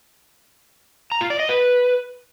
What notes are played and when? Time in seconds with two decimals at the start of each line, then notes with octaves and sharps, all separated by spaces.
1.12 A#5
1.21 F4
1.30 D5
1.40 D#5
1.49 B4